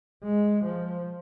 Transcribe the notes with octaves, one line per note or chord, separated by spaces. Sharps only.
G#3
F3